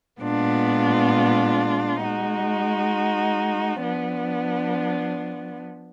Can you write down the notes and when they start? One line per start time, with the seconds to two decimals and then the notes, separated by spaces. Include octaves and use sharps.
0.22 A#2 G#3 B3 D4 F4
2.02 G#3 D#4 F#4
3.82 F3 B3 D4